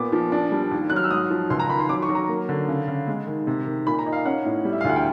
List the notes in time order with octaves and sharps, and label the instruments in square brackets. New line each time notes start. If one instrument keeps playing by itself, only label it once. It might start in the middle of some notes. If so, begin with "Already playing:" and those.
Already playing: [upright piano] A#2 B3 D6
F3
D4
G3
D#2
F#3 F#6
F6
E6
G#2 D#6
F3
C#2 C6
A#5
D#3 B5
C6
F#3 D6
C#6
F#3
A#5
A#3
D3
C#3
C#3
G#3
D#3
C3
D#3
A#2 B5
A#5
D#4
F5
C#4 F#5
A2
G3
E5
F5
D2 F#5
G5